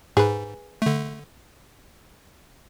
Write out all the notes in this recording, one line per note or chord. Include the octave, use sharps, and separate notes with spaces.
G#2 G#4 B4
D3 A3